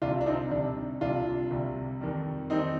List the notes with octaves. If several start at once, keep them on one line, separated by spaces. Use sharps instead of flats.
C2 C3 G3 D4 F4
D4
C4 D#4
C2 C3 G3 D4
C2 C3 G3 D4 F4
C2 C3 G3
F2 D#3 G3
F2 D#3 G3 C4 D#4